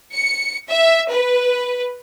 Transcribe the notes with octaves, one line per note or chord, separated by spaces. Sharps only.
C#7
E5
B4